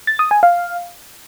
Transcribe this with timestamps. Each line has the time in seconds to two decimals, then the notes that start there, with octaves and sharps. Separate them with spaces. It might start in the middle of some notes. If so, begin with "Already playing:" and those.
0.07 A6
0.19 D#6
0.31 G#5
0.43 F5